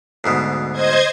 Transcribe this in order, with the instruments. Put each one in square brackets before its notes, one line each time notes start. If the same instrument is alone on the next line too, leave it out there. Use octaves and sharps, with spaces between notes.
[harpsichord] D2 G#2 B2
[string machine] C5 D#5 G#6